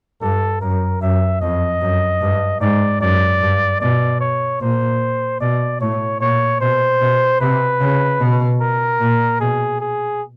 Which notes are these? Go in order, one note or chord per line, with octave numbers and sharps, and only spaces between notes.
G2 A4
F#2 A#4
F#2 E5
F2 D#5
F#2
G2
G#2 D5
F#2 D5
G2
B2 D5
C#5
A#2 C5
B2 D5
A2 C#5
A#2 C#5
B2 C5
B2
C3 B4
C#3
B2
A#4
A#2
B2 G#4
G#4